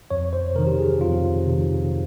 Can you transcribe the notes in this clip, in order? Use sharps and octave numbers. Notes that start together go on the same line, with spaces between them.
F2 C#5
C5
C3 D#3 A#4
G4
G#4
F2 F4
C3 D#3